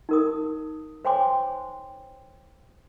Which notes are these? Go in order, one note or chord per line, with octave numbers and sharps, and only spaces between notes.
D#4 A#4 D#6
C5 C#5 G5 G#5 C6 D6